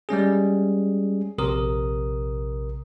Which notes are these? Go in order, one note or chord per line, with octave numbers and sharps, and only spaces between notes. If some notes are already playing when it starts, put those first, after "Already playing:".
G3 G#3 C#4 G#4
A#1 C3 A#4 D#6